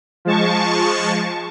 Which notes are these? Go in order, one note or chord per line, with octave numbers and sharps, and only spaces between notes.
F3 G#3 A5 C#6